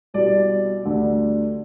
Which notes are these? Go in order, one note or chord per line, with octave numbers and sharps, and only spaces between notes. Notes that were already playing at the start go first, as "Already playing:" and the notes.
C2 B2 G3 B3 D5
D2 D3 G3